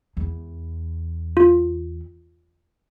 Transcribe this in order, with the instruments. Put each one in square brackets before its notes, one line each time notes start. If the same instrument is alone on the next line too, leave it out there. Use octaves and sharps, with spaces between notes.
[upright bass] E2
[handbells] F4